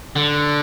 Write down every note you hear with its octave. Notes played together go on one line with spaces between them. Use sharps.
D3